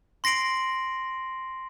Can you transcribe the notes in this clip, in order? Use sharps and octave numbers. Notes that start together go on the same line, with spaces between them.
C6 A#6 C7 D7 F#7